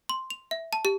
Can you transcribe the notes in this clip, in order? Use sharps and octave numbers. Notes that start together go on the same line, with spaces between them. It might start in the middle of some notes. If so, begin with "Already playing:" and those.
C6
F7
E5
A5
G4